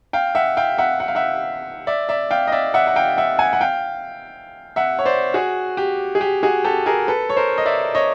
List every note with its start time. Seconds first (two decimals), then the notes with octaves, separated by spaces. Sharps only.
0.13 F5 G5
0.35 E5 F#5
0.57 F5 G5
0.78 E5 F#5
1.00 F#5
1.08 F5
1.15 E5 F#5
1.87 D5 E5
2.09 D5 E5
2.31 F5 G5
2.48 D#5
2.52 D5 E5
2.74 E5 F#5
2.87 F#5
2.96 F5 G5
3.18 E5 F#5
3.39 F#5 G#5
3.53 F#5
3.61 F5 G5
4.76 E5 F#5
4.99 C#5
5.05 C5 D5
5.34 F#4 G#4
5.77 G4
6.15 G#4
6.21 G4
6.43 F#4 G#4
6.64 G4 A4
6.86 G#4 A#4
7.08 A4 B4
7.29 C#5
7.36 A#4 C5
7.58 D#5
7.66 D5 E5
7.95 C#5 D#5